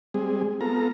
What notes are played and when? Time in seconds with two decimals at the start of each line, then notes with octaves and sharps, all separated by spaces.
0.14 G3 G#3 C4 G#4
0.61 B3 F4 A4 A#5